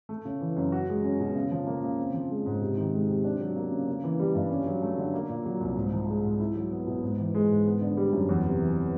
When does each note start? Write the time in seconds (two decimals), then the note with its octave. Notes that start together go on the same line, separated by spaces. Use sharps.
0.09 A3
0.25 C#3
0.41 E3
0.57 F#2
0.72 F#4
0.89 G#3
1.04 C#4
1.20 B2
1.36 C#3
1.51 F3
1.67 A#3
1.83 C#3
1.98 C4
2.14 F3
2.30 G#3
2.46 G#2
2.61 C3
2.77 D#3
2.93 G#3
3.09 C3
3.24 D4
3.40 F#3
3.56 A#3
3.72 C#3
3.87 A#3
4.04 E3
4.20 G3
4.35 G2
4.50 C#4
4.66 F#3
4.82 A3
4.98 D3
5.14 A#3
5.29 A#2
5.46 F#3
5.61 C2
5.77 G#2
5.93 F3
6.08 G#3
6.24 G#2
6.40 E4
6.55 F#3
6.71 B3
6.87 B2
7.03 G#2
7.19 E3
7.35 G#3
7.50 G#2
7.66 B3
7.81 D3
7.97 G3
8.13 F#2
8.29 E2
8.45 C3
8.60 E3